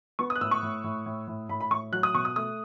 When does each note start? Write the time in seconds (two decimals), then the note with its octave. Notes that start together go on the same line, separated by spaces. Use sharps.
0.19 B3 C#6
0.30 D#6
0.35 F#6
0.41 A2 E6
0.51 C#6
0.62 A2
0.84 A2
1.06 A2
1.28 A2
1.49 A2 B5
1.61 B5
1.70 A2 C#6
1.92 F#3 F#6
2.03 D#6
2.14 B2 C#6
2.25 D#6
2.36 A3 D#6